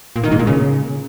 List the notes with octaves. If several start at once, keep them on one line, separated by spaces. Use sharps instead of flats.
A#2
D#3
G#2
A#2
C#3